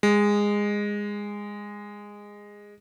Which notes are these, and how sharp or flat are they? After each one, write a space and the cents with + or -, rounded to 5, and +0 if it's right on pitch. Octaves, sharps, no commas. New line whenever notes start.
G#3 -15